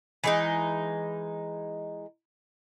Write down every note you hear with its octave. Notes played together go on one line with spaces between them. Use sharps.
E3 G#3 D#4